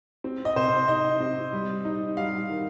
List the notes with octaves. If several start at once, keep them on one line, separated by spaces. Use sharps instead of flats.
C4
D#5
C3 C5
D#4 D#5
C4
G3
D#4
G3 F5
D#3